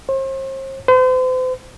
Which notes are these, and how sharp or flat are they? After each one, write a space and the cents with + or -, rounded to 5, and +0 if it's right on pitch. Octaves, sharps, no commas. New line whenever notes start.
C5 +40
C5 -40